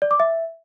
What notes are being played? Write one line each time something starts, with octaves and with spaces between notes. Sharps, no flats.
D5
D6
E5